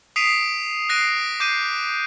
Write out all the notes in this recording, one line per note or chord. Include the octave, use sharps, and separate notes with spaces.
D#6 B6 C7 D7 D#7 F7
F#6 A#6 C7 D7 D#7
D6 G6 C7 D#7